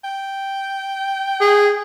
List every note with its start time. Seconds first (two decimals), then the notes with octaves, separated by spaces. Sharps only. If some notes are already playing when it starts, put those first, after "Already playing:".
0.04 G5
1.41 G#4